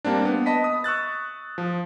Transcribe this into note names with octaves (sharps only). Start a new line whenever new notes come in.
G3 A#3 C4 D4
B3
D#5 A5 B5 B6
D#6
C#6 E6 F#6 A6
F3